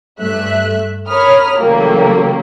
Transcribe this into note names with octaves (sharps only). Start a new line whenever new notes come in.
G2 A3 E5 F#6
A#4 C#5 B5 D#6 F6
C#3 E3 F#3 G3 A3 A#3